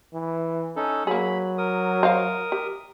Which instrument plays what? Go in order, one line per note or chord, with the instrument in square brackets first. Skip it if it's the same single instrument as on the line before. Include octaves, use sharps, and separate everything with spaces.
[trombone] E3
[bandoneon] C#4 D#4 A4
[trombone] F#3 [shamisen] A#3 G#4 [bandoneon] B5
[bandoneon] A#4 D#6
[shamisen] C5 D#5 F5
G4